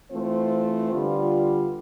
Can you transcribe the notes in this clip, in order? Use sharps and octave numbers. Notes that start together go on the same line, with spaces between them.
E3 A3 C4 F4 C5
D3 G3 B3 F4